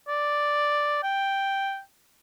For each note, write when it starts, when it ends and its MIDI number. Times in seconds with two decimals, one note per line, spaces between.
0.08 0.99 74
1.04 1.80 79